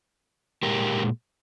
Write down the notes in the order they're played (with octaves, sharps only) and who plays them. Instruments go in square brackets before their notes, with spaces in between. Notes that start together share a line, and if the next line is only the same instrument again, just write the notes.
[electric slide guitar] A#2 G#3 G4 A#4